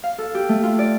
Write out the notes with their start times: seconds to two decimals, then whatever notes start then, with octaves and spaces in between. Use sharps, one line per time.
0.03 F5
0.18 A4
0.35 G4
0.49 A3
0.63 F4
0.79 D5